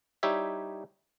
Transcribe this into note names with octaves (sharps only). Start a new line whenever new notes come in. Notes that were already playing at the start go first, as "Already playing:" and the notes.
G3 D#4 E4 G4 C#5 E5